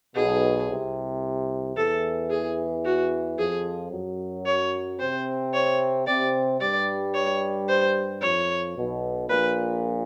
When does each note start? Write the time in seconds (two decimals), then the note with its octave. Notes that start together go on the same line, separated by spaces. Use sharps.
0.16 B1 B2 G#4
0.69 C2 C3
1.77 E2 E3 A4
2.31 G#4
2.85 F#4
3.38 F2 F3 G#4
3.92 F#2 F#3
4.46 C#5
4.99 C3 C4 C5
5.54 C#5
6.07 C3 C4 D5
6.61 G2 G3 D5
7.14 C#5
7.68 C5
8.22 F2 F3 C#5
8.76 B1 B2
9.29 A#1 A#2 B4